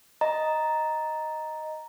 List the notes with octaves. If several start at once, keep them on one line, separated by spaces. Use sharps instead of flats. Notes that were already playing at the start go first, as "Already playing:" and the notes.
D#5 A#5